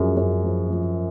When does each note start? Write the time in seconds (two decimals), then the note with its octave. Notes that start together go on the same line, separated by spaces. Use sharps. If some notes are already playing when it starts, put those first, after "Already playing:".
Already playing: F#2 F3 G#4
0.17 F#2
0.44 F3
0.70 F3